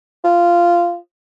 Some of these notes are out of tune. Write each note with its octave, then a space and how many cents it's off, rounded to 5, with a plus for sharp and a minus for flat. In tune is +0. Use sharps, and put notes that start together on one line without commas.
F4 -10